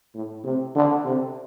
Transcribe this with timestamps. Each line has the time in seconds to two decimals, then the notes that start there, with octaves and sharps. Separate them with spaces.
0.15 A2
0.44 C3
0.75 D3
1.05 C3